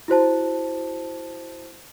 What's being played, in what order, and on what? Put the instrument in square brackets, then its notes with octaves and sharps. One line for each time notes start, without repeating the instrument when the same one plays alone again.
[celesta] E4 F#4 C5 A5